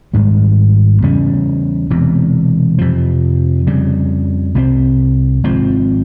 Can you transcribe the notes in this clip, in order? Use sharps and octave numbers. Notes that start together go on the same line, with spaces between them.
G#1 G#2 G3
E2 C#3 G3 C#4
E1 E2 C3
F2 C3 F3
F2 C#3 G3
C2 C3 G3 C4
G#1 G#2 F3 C4